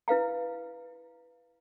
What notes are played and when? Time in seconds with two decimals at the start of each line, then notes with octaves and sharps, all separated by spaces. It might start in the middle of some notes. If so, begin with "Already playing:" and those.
0.08 E4 B4 F5 A#5